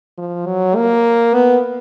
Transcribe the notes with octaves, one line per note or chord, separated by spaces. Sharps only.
F3
F#3
A#3
B3